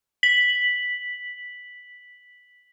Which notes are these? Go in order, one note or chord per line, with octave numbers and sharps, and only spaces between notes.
B6 F#7